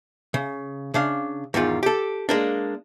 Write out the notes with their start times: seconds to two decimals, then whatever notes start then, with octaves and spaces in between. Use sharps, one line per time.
0.34 C#3
0.94 C#3 D4 F5
1.54 E2 G#2 D#3 F4
1.83 G4 A4
2.29 G#3 A#3 D4